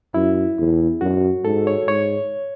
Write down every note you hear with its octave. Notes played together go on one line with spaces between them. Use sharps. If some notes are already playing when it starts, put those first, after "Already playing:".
F#2 E4
E2
F#2 F#4
G#2 A4
C#5
G#2 C#5